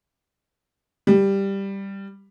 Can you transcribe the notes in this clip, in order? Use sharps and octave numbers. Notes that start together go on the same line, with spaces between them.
G3